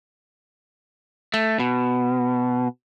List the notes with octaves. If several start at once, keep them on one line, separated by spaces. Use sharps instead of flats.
A3
B2